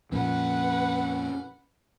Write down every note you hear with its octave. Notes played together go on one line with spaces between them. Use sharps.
F2 A#2 F3 C#4 B4 F#5